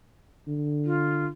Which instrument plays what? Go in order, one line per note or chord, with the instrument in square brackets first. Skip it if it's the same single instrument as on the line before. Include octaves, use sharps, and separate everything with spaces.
[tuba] D3
[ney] F4